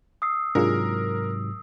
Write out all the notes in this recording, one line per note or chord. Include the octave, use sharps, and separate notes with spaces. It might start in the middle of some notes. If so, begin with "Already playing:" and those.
D#6 E6 C7
G#2 C3 F#3 D4 F4 G#4 A#4